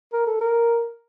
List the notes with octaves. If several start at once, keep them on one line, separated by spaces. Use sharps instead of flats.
A#4
A4
A#4